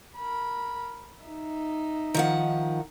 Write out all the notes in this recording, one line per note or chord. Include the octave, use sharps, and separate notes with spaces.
A#4 B5
D#4 E5
D#3 F3 F#5